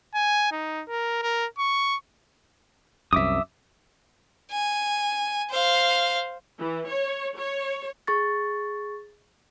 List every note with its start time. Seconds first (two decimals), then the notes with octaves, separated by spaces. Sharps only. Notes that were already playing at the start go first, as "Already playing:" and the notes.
0.15 G#5
0.52 D#4
0.89 A#4
1.22 A#4
1.59 C#6
3.13 C2 F#2 E5 D6 D#6
4.52 G#5
5.51 C5 F5
6.59 E3
6.89 C#5
7.36 C#5
8.07 G#4 C#6 A6